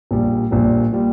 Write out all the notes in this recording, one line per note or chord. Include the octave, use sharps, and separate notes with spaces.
A#1 A#2 G3
A#1 A#2 G3
A#2 G3